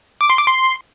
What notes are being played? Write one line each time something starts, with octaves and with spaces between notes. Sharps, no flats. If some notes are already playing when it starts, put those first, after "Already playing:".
D6
C6
D6
C6